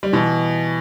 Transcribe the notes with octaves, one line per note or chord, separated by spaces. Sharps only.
G3
B2 E3